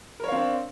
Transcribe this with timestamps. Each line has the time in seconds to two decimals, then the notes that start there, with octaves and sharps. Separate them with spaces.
0.20 A#4
0.24 C#5
0.28 F5
0.32 C4
0.36 D4